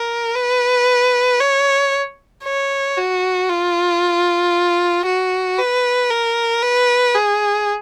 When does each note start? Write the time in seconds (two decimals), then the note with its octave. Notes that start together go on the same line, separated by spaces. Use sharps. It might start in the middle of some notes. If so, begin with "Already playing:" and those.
Already playing: A#4
0.35 B4
1.40 C#5
2.44 C#5
2.97 F#4
3.50 F4
5.06 F#4
5.58 B4
6.11 A#4
6.63 B4
7.15 G#4